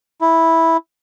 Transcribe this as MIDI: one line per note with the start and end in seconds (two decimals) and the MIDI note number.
0.21 0.77 64